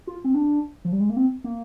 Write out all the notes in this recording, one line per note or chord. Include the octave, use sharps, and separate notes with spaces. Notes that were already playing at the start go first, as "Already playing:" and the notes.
F4
C4
D4
F3
G3
G#3
A#3
C4
A#3